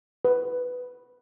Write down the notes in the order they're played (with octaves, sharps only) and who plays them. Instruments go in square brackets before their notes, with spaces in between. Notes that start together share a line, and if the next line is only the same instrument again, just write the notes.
[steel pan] B4